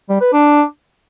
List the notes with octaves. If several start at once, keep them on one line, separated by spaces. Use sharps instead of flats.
G3
B4
D4